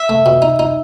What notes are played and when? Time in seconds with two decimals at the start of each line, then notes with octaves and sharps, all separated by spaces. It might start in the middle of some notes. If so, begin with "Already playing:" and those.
Already playing: E5
0.09 A3
0.26 B2
0.42 D#4
0.59 D#4